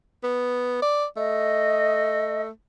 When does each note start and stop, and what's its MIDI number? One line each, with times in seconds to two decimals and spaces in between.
0.23 0.79 59
0.82 1.05 74
1.17 2.49 57
1.17 2.42 75